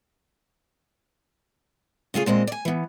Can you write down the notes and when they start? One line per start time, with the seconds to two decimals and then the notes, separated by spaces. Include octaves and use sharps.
2.14 C#3 A3 F4 G#4
2.26 A#2 G#3 C4 D#5
2.47 D5 G#5
2.65 E3 B3